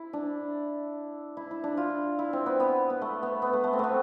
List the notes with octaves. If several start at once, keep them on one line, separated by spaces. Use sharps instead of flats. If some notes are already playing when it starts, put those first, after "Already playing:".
Already playing: E4
D4
E4
E4
D4
F4
E4
C4
B3
B3
B3
A3
B3
B3
A3
A3
C4
A3 B3